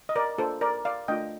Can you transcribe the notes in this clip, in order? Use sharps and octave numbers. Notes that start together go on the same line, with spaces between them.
D#5
A#4 D5
A#3 D4 F4 A4 C5
A#4 D5
D5 F5
A3 D4 F4 D#5 G5